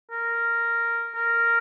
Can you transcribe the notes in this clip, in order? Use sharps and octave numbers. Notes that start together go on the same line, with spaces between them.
A#4
A#4